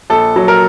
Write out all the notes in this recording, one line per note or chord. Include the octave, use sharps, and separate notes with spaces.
A#1 A4
F#3
A#4